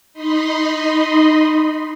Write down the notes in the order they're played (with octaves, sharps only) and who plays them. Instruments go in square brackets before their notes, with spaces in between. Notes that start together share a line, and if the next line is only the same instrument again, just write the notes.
[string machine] D#4 D#5 B5 C6